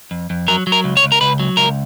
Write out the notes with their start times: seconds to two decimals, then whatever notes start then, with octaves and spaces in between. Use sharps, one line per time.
0.11 F2
0.30 F2
0.48 F#3 A#4
0.67 F#3
0.72 A#4
0.84 C#2
0.97 C#5
1.03 C#2
1.12 A#4
1.21 C#2 B4
1.40 F#3
1.57 C#2 A#4